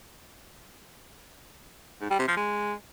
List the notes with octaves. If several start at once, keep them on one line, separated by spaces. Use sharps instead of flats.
G#2
G3
C3
F3
G#3